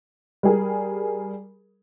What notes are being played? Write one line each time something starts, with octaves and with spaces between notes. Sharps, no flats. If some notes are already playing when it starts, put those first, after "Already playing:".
G3 G#4 A#4